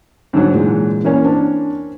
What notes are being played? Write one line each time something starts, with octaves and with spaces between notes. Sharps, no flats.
G#2 D3 F#3
A#2 E3 G#3
E3 A#3 C#4
C4 D4